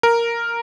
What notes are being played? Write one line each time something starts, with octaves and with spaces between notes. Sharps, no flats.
A#4